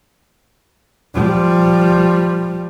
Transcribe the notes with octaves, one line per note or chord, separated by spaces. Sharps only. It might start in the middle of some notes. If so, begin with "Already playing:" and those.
F3 G3